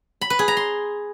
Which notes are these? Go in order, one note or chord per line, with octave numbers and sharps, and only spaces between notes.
B5
B4
G#4
A#5
C6